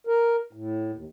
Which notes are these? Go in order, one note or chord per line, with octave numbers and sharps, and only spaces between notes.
A#4
A2
D#2